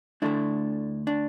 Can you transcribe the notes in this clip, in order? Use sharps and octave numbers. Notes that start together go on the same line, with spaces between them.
D2 D3 A3 D4 E4
D4